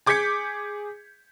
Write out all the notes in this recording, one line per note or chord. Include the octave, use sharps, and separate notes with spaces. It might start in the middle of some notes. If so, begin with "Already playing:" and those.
G#4 D6 G6 G#6 B6 C#7